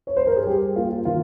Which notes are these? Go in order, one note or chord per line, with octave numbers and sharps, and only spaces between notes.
C#5
C5
A#4
G#4
G3 G4
A#3 F4
D#3 F4